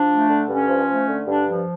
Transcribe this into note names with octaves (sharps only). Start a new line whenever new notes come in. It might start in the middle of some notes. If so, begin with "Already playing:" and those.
Already playing: F3 D4
A3
D3
G2 C#4
F3
A3
D3
G2 D4
F3